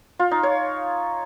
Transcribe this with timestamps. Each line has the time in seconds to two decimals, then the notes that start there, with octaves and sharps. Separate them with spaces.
0.19 F4
0.31 D#4
0.43 C#5